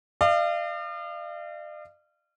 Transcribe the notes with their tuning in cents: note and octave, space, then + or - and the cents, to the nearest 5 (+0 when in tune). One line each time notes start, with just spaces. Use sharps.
D5 +45 F5 -30